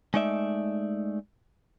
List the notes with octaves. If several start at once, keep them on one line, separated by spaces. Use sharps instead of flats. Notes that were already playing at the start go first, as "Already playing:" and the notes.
G#3 A3 D#4 D5 E5